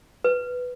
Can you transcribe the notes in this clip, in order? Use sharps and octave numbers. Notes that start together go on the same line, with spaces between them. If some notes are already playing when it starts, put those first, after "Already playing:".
B4